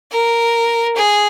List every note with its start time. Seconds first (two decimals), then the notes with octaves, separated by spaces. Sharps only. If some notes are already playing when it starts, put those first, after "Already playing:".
0.12 A#4
0.96 G#4